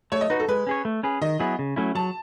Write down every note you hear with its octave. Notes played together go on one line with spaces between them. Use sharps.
A3 C#5
D#5
D#4 F#4 B4
A4
G#3 B4
C#4 G#4 C#5
A3
C#4 G#4 B4
D#3 D#5
F#3 B3 E4 G#4
C#3
F#3 A3 C#4 E4
F#3 A5